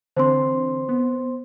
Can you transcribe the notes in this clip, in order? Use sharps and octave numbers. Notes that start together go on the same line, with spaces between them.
D3 E3 C4 C5 C6
B3